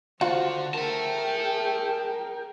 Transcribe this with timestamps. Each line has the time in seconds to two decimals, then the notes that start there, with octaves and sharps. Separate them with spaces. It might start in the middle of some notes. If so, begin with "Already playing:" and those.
0.21 D3 F4 F#4 C5 F#5
0.74 G#4 A#4 E5 G5 A5